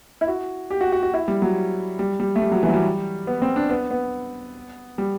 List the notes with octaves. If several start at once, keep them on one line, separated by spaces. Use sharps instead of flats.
E4
F#4
G4
F#4
F#4
F#4
E4
G3
F#3
G3
G3
A3
G3
F#3
E3
F#3
G3
B3
C4
D4
B3
B3
G3